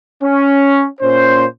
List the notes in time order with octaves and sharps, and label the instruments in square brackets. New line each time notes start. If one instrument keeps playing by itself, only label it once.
[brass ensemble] C#4
A#2 C#4 C5